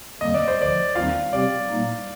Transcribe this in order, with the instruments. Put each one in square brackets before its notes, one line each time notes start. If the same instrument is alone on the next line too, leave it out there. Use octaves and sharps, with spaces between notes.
[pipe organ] F2 D3 G3 A#3 [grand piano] D#5
[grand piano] D5
C5
[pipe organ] D2 D3 F3 [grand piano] D5
[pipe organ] D#2 D#3 G3 C4 D#4 [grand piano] F4 F5
[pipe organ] C3 G3 C4 G4 [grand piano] D5
[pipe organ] A#2 G3 A#3 D#4